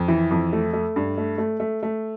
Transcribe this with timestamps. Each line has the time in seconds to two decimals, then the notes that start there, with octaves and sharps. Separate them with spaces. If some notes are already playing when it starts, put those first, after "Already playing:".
Already playing: F2
0.08 E3
0.31 F2
0.53 A3
0.73 A3
0.96 G2
1.18 A3
1.38 A3
1.60 A3
1.83 A3